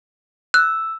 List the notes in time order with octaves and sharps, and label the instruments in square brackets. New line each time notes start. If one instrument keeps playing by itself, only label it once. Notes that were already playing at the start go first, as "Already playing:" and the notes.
[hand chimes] E6 [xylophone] F#6